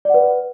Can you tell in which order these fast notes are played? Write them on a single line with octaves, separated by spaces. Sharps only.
D5 F#5 B4